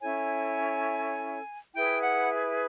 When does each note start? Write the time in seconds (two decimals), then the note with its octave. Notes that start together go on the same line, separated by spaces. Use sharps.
0.01 C#4 E4 A4 C#5 G#5
1.75 E4 G#4 B4 G5
2.04 F#5